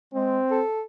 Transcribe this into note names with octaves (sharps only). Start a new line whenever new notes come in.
G#3 C4
A4